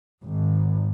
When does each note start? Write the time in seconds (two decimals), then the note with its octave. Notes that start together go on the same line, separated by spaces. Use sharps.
0.22 G#1